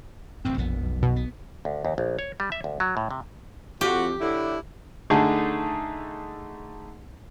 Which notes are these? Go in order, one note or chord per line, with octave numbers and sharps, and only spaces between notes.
D1 A1 G2 C4
E1 A#1 F2 B3
B1
B2
B3
D2
D#2
A#1
C#5
G3
E5
D2
F#3
A2
C3
F2 F#4 G4
A2 D3 E4
D3 A3 D#4 G#4